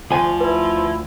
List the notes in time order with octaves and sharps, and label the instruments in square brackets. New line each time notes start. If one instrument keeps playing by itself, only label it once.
[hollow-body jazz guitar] D2 G#5 [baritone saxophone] F3
[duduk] E4 [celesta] B4